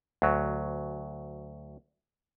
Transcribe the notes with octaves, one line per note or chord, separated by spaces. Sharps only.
D2 F#3